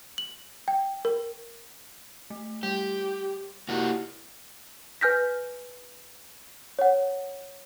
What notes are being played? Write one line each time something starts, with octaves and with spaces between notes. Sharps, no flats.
F#7
G5
A#4
A3
G3 G4
G#3 A#3 E4 F#4 G4
B4 G#5 F6 G6 A#6 B6
C#5 F#5